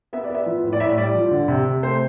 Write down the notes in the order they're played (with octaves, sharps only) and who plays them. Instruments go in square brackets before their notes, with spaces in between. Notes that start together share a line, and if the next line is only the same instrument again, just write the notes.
[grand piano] B3 E5
D5
B3 E5
F3
A2
D5
A2 E5
G3 D5
F3
D3
C3
C3
A3 C5